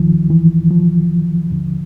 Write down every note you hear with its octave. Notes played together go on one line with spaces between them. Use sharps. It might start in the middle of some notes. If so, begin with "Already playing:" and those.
Already playing: D#2 D#3 F3
E3
F3
D#2 D3